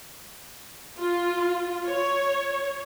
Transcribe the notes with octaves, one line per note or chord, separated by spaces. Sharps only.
F4
C#5